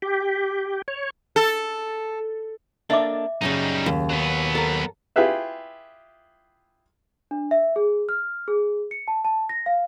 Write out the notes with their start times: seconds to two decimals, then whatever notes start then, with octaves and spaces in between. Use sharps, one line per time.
0.02 G4
0.88 C#5
1.36 A4
2.90 A#3 D4 A4 D#5 E5 D6
3.41 F#2 A2 C#3 G3 D#4
3.86 D#2
4.09 F#3 B3
4.55 A4 A#4
5.16 E4 F4 G4 G#4 B4 E5
7.31 D4
7.51 E5
7.76 G#4
8.09 F6
8.48 G#4
8.91 C#7
9.08 A5
9.25 A5
9.49 A#6
9.66 F5